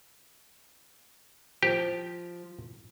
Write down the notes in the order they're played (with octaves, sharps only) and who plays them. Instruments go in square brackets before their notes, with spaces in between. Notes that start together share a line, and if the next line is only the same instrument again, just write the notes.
[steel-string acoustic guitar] F3 [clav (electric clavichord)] G4